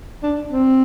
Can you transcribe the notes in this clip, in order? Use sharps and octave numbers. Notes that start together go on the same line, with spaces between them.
D4
C4